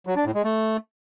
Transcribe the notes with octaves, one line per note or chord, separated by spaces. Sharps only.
F#3
D4
A2
G#3
A3